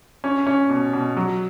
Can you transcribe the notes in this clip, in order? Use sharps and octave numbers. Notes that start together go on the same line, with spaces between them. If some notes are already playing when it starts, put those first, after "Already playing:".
C#4
C#4
B2
B2
F#3